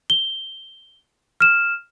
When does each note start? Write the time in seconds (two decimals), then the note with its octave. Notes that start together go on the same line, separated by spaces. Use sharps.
0.10 G7
1.40 F6 E7